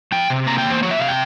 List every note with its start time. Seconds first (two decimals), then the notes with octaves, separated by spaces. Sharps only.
0.12 F3 G5
0.30 C3
0.46 A#3 A#5
0.58 G5
0.65 E2
0.70 C5
0.82 F3 C#5
0.91 E5
0.99 C3 F5
1.08 G5